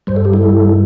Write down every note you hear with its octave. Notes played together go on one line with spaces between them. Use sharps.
G2 G3 C5
A4
G4
E4 A4